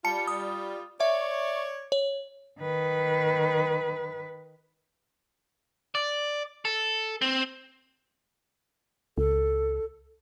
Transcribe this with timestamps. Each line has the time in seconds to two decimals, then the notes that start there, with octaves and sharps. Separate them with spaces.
0.05 G3 F4 A5 C#7
0.27 D#6
1.00 C#5 D5 E5
1.92 C#5
2.60 D#3 B4
5.95 D5
6.65 A4
7.21 C4
9.18 C#2 A4